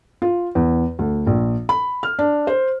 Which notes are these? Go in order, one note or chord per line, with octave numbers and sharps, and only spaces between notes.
F4
E2
D2
A#1
B5
F6
D4
C5